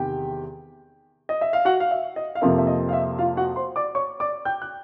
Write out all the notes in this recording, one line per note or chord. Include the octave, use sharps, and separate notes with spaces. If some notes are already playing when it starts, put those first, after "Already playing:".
Already playing: E2 C3 D#3 G4 G5
D#5
E5
F5
F#4 F#5
F5
E5
D#5
F5
F2 C3 F3 A#3 E5
E5
D#5
F5
E5
F4 F5
F#4 F#5
C5 C6
D5 D6
C#5 C#6
D5 D6
G5 G6
F#6